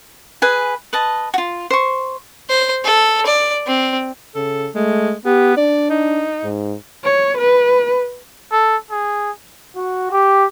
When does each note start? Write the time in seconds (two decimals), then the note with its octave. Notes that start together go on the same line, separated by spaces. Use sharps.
0.42 G#4 B4 G#5
0.93 B4 D#5 A5
1.34 F4 F#4
1.70 C5 C#6
2.49 C5
2.84 A4
3.26 D5
3.67 C4
4.35 C#3 A4
4.75 G#3 A3
5.26 B3 G4
5.57 D4 D5
5.90 D#4
6.44 G#2
7.04 C#5
7.38 B4
8.52 A4
8.91 G#4
9.76 F#4
10.11 G4